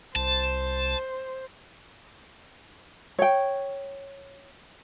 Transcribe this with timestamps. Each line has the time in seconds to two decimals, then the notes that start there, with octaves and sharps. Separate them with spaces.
0.16 C2 C5 A5
3.19 C#5 G5